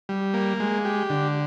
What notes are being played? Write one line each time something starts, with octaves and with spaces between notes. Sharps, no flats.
G3
A#3
G#3
G4
D3